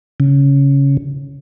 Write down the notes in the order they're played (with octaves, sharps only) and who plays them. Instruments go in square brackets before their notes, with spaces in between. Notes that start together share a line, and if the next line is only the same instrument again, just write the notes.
[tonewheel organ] C#3